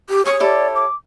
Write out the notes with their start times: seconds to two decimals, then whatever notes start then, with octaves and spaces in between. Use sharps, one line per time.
0.10 G4
0.25 G#4 C#5 C#6 D#6
0.40 E4 G4 A4 D5
0.75 D6